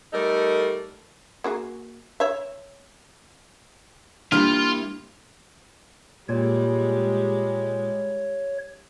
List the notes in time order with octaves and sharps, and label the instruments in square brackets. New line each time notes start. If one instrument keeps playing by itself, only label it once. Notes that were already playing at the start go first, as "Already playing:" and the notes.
[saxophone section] G3 A3 D#4 A4 A#4
[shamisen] A#3 F#4 G#4
C#5 E5
[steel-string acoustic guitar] G3 A#3 E4 [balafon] D4 [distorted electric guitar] F4 [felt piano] F6
[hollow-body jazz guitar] A#2 [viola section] G3 G#3 [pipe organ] C#5